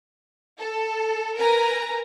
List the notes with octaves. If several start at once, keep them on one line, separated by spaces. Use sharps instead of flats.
A4
A#4 B4 G#5 A#5